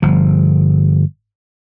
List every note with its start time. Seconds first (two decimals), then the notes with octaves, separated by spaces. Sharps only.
0.02 G1 F3